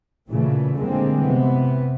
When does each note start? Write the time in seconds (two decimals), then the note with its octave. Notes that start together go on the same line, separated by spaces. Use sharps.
0.28 A#2 C#3 E3 A3
0.75 D3 G3 G#3 A#3 C4
1.22 C3 E3 B3